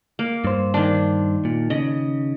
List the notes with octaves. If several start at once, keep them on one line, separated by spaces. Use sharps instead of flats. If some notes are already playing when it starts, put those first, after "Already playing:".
A#3
G2 C5
D#3 D4
A#2
C#3 D#5